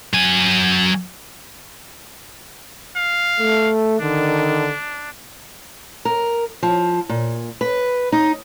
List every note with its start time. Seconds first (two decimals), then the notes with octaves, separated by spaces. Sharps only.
0.13 F#3 G#5
2.97 F5
3.38 A3
4.00 D3 D#3 D4
6.05 A#4
6.63 F3
7.09 A#2
7.61 B4
8.12 D#4